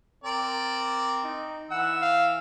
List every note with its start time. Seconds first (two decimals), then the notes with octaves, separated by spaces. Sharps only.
0.24 C4 A#4 D5
1.24 D#4
1.71 E3 F#5 E6
2.01 F5